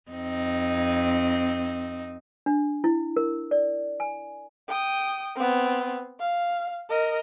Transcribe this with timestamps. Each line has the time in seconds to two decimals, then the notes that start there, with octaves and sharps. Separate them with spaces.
0.11 F2 C4 D#4
2.46 D4
2.84 E4
3.17 A#4
3.51 D5
4.00 G#5
4.68 G5 D#6
5.36 B3 C4
6.20 F5
6.89 A#4 D#5